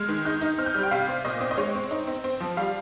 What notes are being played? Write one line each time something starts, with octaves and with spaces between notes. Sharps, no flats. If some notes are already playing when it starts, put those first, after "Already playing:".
Already playing: G#3 F6
D#3
D#4 G6
D#4
C4 F6
G6
G3 F6
G5
C3 F5
C4
A#2 D#5
C4
D#5
G#3 C#5
C4
D#4
C4
C4
F3
G3 F5